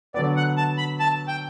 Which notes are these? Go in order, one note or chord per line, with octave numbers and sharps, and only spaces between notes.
D3 F#3 B3 D5
F#5
A5
B5
A5
G5